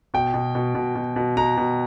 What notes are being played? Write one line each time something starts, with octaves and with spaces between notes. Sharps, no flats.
B2 G5
B2
B2
B2
B2
B2
B2 A#5
B2